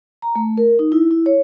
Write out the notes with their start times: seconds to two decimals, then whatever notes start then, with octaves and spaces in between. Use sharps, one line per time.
0.22 A#5
0.36 A3
0.58 A#4
0.79 D#4
0.92 E4
1.11 E4
1.26 C#5